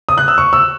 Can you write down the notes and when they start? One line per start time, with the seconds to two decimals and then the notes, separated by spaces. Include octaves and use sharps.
0.09 D#6
0.18 F#6
0.28 E6
0.38 C#6
0.53 E6